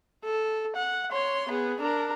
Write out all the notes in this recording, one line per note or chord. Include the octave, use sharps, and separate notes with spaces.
A4
F#5
C#5 C6
B3 G#4
D4 A#4